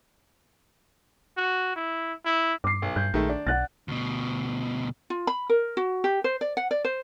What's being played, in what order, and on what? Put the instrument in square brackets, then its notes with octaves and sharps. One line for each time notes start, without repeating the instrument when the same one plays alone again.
[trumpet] F#4
E4
E4
[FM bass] G2 [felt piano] D6 C7
[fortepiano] B1
[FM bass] G2 [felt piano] G6
[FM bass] A#1 [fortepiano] D#3 G#3 A3
[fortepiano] D4
[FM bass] B1 [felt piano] F#5 F#6 A6
[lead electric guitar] D2 B2
[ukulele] F4
B5
A#4
F#4
G4
C5
D5
F#5
D5
C5